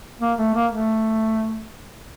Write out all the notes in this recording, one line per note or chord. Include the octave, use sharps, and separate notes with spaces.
A#3
A3
A#3
A3